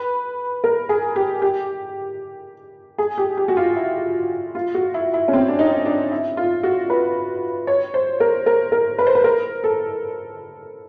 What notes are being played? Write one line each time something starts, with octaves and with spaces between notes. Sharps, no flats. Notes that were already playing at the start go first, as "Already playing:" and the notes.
Already playing: B4
A#4
G#4
G4
G4
G#4
G4
G4
F#4
F4
E4
F4
F#4
E4
E4
C#4
C4
D4
D#4
D4
E4
F4
F#4
B4
C#5
C5
A#4
A#4
A#4
B4
C5
B4
A#4
A4